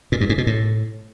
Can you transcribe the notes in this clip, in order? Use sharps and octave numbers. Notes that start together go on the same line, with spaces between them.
A#2
G2
G#2
B2
A2